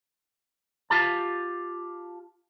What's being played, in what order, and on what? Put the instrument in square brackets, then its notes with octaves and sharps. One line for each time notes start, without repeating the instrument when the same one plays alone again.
[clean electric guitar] F4 G4 A5